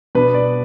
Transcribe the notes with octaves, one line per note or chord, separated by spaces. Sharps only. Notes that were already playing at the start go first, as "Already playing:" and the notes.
B2 B3 D4 B4
D5